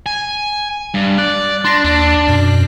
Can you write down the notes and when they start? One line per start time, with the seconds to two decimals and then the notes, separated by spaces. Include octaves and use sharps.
0.06 G#5
0.94 G2
1.18 D5 F#6
1.64 D4 C6 A6 A#6
1.84 D#2 D4
2.28 F#2 B2